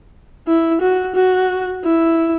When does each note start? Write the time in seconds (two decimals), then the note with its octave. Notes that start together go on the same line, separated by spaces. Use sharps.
0.47 E4
0.81 F#4
1.16 F#4
1.84 E4